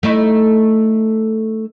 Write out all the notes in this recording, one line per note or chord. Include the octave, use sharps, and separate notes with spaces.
A3 D#4 E4